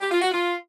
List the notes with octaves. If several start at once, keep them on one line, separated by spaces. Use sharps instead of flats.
G4
F4
F#4
F4